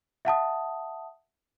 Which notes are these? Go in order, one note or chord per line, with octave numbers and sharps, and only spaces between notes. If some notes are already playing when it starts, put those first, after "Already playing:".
E5 F#5 A5 D#6